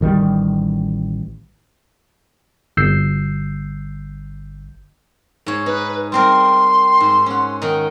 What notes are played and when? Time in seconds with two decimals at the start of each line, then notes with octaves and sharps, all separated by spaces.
0.01 A1 D#3 F3 G3
2.77 G1 E6 G6 C7
5.46 G#2 C#5
5.66 D#4 B4
6.12 G3 C4 A#4 C6
7.00 G#2
7.26 C#4 F#5
7.62 D#3 D#4